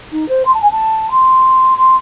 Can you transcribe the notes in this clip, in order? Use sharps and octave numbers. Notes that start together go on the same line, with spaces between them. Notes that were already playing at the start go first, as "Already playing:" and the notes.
D#4
C5
C6
A5
G#5
A5
C6
C6